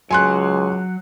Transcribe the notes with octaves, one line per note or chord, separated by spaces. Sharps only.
C#2 F#3 G#5 C6 F#6